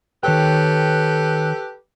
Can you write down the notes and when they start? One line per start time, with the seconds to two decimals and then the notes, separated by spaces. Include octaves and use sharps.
0.23 D#3 G4 A4 B4 C#5 G5